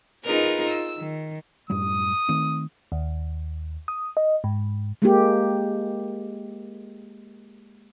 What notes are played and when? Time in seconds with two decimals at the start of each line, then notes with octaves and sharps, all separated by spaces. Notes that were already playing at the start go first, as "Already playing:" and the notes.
0.25 D#4 F4 G#4 A#4 B4
0.68 E6
0.98 D#3
1.70 F#2 A2 G3 D#6
2.29 D#3 A3 C4
2.92 D#2
3.88 D#6
4.17 D#5
4.44 G#2
5.02 G#3 A#3 G4